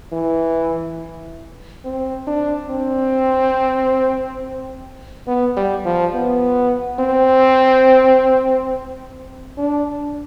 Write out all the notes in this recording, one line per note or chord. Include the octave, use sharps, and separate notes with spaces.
E3
C4
D4
C4
B3
G3
F3
B3
C4
D4